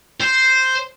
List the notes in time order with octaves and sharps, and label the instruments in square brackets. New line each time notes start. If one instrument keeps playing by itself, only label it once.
[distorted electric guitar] C5